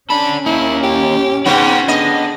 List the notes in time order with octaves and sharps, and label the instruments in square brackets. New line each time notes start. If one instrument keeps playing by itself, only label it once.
[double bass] C#4 [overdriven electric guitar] D4 A4 [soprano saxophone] B5
[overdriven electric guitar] A#3 D#4 [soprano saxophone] E4
[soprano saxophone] G4
[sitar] G#2 C#3 B3 [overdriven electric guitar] F#4 [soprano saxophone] G5
[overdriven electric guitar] D3 [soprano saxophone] B3 [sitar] D#5